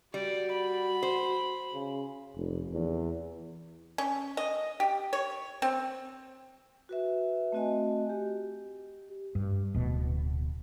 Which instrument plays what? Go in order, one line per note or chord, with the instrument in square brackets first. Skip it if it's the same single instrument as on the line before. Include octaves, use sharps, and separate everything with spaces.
[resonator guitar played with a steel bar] G3 [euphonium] F#4 [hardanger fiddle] D5
[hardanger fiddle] B5
[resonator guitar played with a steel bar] C5
[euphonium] C#3
[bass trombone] F1
E2
[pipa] C#4
D#5
G4
C#5
C4
[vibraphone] F#4 B4 E5
A3 C4 F#4 D#5 G#5
G4
[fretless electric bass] G2
D1 B2